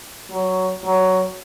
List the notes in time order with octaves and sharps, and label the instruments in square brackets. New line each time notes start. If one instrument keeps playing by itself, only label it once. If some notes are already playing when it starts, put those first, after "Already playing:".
[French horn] F#3
F#3